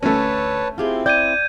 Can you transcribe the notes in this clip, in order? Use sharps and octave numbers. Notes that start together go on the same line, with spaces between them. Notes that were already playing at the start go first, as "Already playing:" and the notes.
D2 A3 C#4 B4 C#5 A5
C4 E4 F4 G4 G#4
D5 G5 G6 G#6 D#7